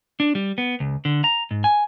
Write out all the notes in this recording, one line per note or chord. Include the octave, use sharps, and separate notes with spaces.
D4
G3
B3
C#2
D3
A#5
G#2
G#5